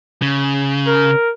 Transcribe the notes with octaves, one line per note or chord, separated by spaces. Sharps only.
C#3
A#4